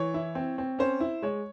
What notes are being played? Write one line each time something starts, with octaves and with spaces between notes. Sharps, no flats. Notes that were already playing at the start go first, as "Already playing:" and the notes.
Already playing: E3 C#5
E4
C4
C4
C#4 C5
E4
G#3 C#5